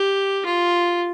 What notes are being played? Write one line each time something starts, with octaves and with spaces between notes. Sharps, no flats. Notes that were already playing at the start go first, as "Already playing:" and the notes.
Already playing: G4
F4